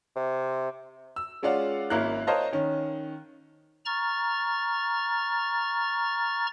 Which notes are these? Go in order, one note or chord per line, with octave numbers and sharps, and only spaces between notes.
C3
E6
G#3 C#4 F4 D5 F5 F#5
G#1 A#3 C#4 E4 F5 F#6
A#4 C5 C#5 D#5 F5 A5
D#3 C#4
A#5 C#6 F6 A6